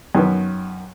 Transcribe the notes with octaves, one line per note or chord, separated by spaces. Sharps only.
F#2 D#3 B3